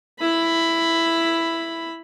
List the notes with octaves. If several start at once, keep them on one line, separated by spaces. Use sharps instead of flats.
E4 B5